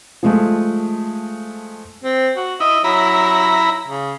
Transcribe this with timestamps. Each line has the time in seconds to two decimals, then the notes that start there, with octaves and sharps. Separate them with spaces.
0.23 F3 G#3 A3
2.03 C4
2.37 F#4
2.60 E4 D#5
2.84 F#3 E4 A#5 B5
3.88 C#3